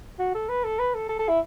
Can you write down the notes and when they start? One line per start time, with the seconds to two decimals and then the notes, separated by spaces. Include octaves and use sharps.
0.19 F#4
0.35 A4
0.49 B4
0.64 A4
0.79 B4
0.94 A4
1.09 A4
1.19 A4
1.29 E4